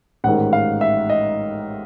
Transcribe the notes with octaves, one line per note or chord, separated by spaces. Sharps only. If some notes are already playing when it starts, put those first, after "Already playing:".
A1 G#2 D#3 F#5
F5
E5
D#5